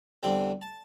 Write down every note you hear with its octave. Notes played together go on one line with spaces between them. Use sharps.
E2 D3 G3 C4 G5
A5